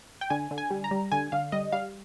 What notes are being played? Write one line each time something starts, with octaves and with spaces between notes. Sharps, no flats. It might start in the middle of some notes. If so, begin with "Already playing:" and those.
G5
D3 G#5
D3
G#5
G3
A#5
G3
D3 G#5
D3 F5
G3 D#5
G3 F5